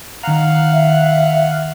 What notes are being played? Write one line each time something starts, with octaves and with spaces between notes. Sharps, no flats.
D#3 F5 F#5 A#5
E5